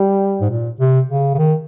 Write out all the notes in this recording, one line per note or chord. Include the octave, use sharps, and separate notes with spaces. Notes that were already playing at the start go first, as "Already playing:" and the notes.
Already playing: G3
G#2
A#2
C3
C#3
C#3
D#3